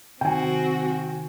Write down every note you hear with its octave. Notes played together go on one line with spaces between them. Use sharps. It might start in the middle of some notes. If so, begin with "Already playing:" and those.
C3 D#3 C4 F#4 G5 G#5